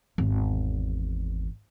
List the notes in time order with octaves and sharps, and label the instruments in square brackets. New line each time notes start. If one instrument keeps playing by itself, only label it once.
[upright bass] G#1 E2